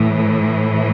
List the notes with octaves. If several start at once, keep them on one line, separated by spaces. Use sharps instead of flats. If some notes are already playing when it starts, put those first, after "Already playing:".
Already playing: A2 E3